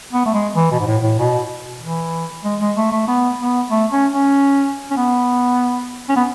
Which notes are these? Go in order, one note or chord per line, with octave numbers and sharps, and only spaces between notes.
B3
A3
G#3
E3
B2
G#2
A2
A2
B2
E3
G#3
G#3
A3
A3
B3
B3
A3
C#4
C#4
C#4
B3
C#4
B3